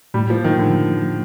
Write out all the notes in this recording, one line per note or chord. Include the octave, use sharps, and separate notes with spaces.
A2 G3
F3 A#3
D#3 F3
A2 D3